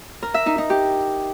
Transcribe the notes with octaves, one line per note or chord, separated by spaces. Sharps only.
A#4
E5
D#4
D#4
G4